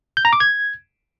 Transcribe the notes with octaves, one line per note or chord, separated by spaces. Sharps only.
G6
A#5
D6
G#6